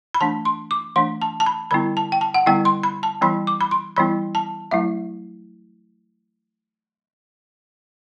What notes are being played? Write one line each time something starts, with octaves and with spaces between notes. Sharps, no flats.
B5
E3 A3 D4 A5
C6
D6
E3 A3 D4 C6
A5
A5
B5
D3 G3 B3 E4 B5
A5
G5
A5
F#5
D3 G3 B3 E4 G5
C6
B5
A5
E3 G3 B3 E4 B5
D6
B5
C6
E3 G3 B3 E4 B5
A5
F#3 A3 E4 E5